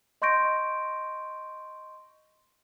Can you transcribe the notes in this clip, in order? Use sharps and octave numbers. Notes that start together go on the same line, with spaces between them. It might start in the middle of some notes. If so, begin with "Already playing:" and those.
D#5 C6 C#6 G6 A#6 D7